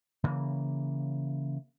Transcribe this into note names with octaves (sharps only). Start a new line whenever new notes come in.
C#3 E3 A#3